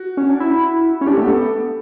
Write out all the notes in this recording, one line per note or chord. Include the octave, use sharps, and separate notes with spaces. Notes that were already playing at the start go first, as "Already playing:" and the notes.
Already playing: F#4
C#4
D4
E4
C#4
D4 G4
A4
A3
B3 G4
A4